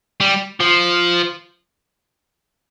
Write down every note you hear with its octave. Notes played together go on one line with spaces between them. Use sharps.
G3
F3